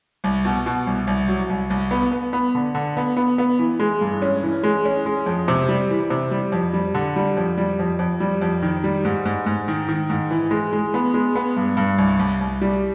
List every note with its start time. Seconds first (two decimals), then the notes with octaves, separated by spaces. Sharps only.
0.24 C2
0.45 B2
0.66 B2
0.87 C2
1.07 C2
1.28 F#3
1.50 C2
1.70 C2
1.91 B3
2.12 B3
2.33 B3
2.55 D3
2.75 D3
2.97 B3
3.17 B3
3.38 B3
3.59 E3
3.80 G#3
4.01 G2
4.22 C#4
4.43 E3
4.63 G#3
4.85 C#4
5.06 G#3
5.26 F2
5.48 C3
5.69 G3
5.90 E3
6.10 C3
6.31 G3
6.52 F2
6.73 G3
6.95 D3
7.16 G3
7.37 F2
7.58 G3
7.79 F2
7.99 F2
8.20 G3
8.41 F2
8.62 D#3
8.84 G3
9.05 G#2
9.25 G#2
9.46 G#2
9.68 D#3
9.89 D#3
10.10 G#2
10.31 E3
10.51 G#3
10.73 G#3
10.94 B3
11.14 G#3
11.35 B3
11.57 G2
11.77 G2
11.98 C2
12.19 C2
12.41 C2
12.61 G3